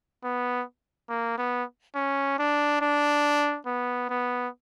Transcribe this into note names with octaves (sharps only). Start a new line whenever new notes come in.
B3
A#3
B3
C#4
D4
D4
B3
B3